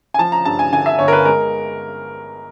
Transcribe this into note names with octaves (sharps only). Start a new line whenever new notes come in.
G#5
F3 A5
A#5
G2 A5
G#5
D3 G#5
E5
G1 C#5
A#4
B4
G#3 A#4